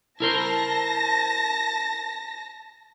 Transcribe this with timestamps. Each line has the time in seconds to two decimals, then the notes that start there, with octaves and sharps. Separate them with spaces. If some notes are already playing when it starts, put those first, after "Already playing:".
0.20 E4 A#4 C5 A5 A#6